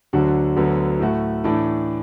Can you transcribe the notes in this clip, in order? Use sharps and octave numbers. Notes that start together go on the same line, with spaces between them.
D2 D3 F#3 D4 F#4
D2 D3 F#3 B3
A2 A3 F#4
A2 E3 A3 D4